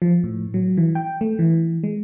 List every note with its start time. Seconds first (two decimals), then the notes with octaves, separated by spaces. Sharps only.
0.02 F3
0.24 A2
0.54 F#3
0.77 E3
0.95 G5
1.21 A3
1.39 E3
1.84 G#3